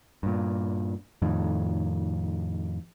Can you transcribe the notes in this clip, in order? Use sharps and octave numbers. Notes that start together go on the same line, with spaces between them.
G2 A#2
F2 A2 D#3